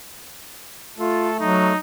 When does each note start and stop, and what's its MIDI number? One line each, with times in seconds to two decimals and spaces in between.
0.98 1.73 57
0.98 1.29 65
0.98 1.37 69
1.40 1.75 54
1.40 1.78 63